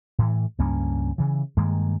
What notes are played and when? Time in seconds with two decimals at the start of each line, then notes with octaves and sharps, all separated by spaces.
0.19 A2 E3
0.58 C#2 G2 A#3 C#4
1.18 C#3 E3
1.57 G2 D#3 G#3 A#3